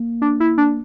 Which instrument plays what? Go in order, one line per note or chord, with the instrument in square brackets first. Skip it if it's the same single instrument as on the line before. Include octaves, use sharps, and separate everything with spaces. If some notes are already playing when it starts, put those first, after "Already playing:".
Already playing: [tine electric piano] A#3
[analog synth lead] D4
E4
D4